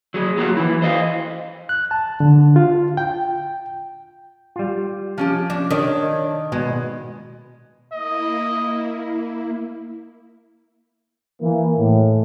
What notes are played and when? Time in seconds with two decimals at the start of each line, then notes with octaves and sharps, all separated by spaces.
0.14 F#3 G#4
0.37 F#3 A#3 F#4
0.57 E3 E4
0.82 C5 D#5 F5
1.69 F#6
1.91 A5
2.20 D3
2.56 F4
2.97 G5
4.56 G3 F4
5.18 F3 C#4 G4
5.50 D4
5.71 D#3 D4 C#5
6.52 B2 G#3 B3
7.92 A#3 E4 D#5
11.41 E3 A#3
11.77 A2